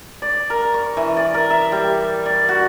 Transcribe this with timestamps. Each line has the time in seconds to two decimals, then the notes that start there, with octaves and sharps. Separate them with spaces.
0.22 D5
0.50 A#4
0.74 C#6
0.97 E3
1.17 D5
1.34 A#4
1.50 E5
1.72 G3
2.26 D5
2.49 F#4